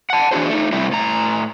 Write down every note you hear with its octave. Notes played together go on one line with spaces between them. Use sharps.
F#5 A5
E3 D4 F#4 G#4 C5
A3 D#4
C3 G3 A3 C4 E4
A2 A#5